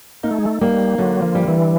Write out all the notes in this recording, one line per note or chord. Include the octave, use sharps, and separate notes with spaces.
A#3 D#4
A3
G#3
A3
G3 A#3
D3 F#3
F3
G3
E3